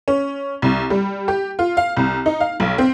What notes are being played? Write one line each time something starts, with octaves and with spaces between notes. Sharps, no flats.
C#4
C2
G3
G4
F4
F5
C2
D#4
F5
B1
C4